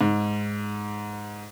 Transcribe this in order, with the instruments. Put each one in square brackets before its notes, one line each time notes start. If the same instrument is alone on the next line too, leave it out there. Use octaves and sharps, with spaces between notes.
[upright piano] G#2